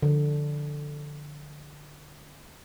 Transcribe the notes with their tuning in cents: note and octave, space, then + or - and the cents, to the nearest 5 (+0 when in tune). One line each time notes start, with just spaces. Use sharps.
D3 +0 F3 +0